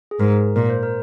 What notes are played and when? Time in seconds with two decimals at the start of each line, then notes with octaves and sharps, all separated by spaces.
0.11 G#4
0.20 G#2 A#4
0.56 A#2 A#4
0.69 C5
0.83 A#4